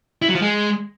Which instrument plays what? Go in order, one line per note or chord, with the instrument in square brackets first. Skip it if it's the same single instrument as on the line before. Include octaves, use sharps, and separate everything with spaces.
[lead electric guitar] E4
F#3
F3
G#3